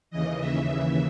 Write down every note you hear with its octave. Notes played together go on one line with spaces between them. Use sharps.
D#2 C#3 E3 D#5
E5